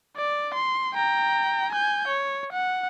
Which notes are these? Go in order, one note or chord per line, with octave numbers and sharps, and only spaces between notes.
D5
C6
G5 A#5
G#5 G6
C#5
F#5